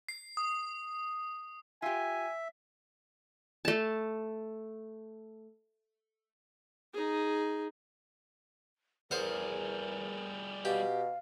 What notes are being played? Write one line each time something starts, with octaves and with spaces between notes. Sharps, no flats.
C7
D#6
F4 G4 E5 G#5
A3 A5
D#4 G#4
E2 G3 G#4 A#4 C5 F5 F#5
B2 G4 F5